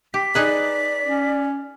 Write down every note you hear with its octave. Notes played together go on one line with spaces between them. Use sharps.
G4 B6
D#4 G#4 B4 D5
C#4